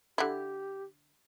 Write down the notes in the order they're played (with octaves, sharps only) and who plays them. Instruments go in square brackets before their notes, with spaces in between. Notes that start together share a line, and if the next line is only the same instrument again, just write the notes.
[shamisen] D3 E4 [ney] G4